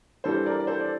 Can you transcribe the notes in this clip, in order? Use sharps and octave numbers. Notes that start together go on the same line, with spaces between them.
G2 E3 G3 A4 C5
A#4 D5
D5
A4 C5
D5